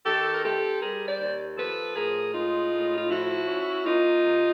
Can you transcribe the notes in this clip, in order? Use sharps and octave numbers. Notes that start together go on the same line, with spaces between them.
D#3 G4 A4
A#4
C4 G4 A4
G3 G#4 A#4
C5 D5
D#2
F3 A4 B4
A2 G#4 A#4
G#3 D#4 F4
A2
F4
F3 E4 F#4
C#4
A#3 D#4 F4
C3